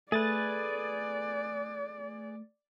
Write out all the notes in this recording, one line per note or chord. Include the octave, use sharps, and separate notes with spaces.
A3 G#4 B4 D5 A6